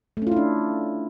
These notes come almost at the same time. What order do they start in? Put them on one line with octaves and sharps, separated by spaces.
A3 C#4 F4 E4 D4